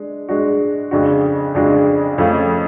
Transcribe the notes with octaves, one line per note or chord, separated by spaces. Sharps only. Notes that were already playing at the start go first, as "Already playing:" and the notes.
Already playing: G#3 D4
G#3 D4 F#4
F2 C#3 G#3 D4 F#4
F2 C#3 G#3 D4 F#4
F2 F3 A3 C#4